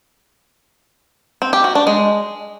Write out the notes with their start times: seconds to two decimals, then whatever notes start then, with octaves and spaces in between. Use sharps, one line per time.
1.42 C4
1.53 G4
1.64 F#4
1.75 D4
1.87 G#3